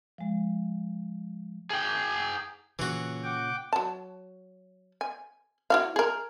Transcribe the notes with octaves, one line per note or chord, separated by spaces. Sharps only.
F3 G#3
G#4 G5
A#2 C#3 E3 F#4
F#5 G5 D6
F#3 A5
G#5
E4 F#4 F5
G#4 A#4